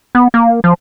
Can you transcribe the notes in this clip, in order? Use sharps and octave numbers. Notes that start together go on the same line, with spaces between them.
B3
A#3
F3